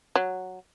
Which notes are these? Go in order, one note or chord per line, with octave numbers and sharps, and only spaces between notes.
F#3